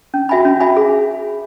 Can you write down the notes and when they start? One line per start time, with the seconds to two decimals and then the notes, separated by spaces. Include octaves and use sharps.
0.14 C#4
0.29 F#4 E5 G#5 B5
0.45 C#4
0.60 F#4 E5 G#5 B5
0.77 G#4